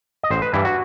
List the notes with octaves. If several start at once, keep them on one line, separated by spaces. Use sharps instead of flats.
D#5
A1 C5
B4
G2 E3 G3 E4
F#4